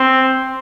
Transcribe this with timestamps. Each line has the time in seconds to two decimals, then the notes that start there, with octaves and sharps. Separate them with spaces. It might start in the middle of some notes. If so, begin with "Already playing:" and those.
Already playing: C4